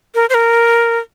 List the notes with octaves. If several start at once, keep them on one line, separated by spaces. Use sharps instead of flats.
A#4
C5
A#4